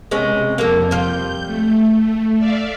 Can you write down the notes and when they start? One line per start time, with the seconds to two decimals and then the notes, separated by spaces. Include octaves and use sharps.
0.11 C3 G#3 B3 C#4
0.58 F2 F3 A#3 A4
0.91 G3 F4 G6
1.46 A3
2.39 D5 E5 F5